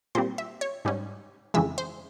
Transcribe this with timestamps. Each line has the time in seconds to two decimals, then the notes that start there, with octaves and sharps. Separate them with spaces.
0.15 A#2 G3 C4 C5
0.38 E5
0.61 C#5
0.85 G#2 G3 C#4
1.54 F2 C#3 E3 G#3 E5
1.78 C5